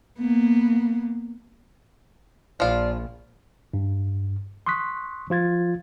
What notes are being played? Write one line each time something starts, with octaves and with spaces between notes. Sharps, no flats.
A#3 B3
A#1 F3 F4 D5
G2
C6 C#6 D#6 F#6 B6
F3 F4 G#6 A6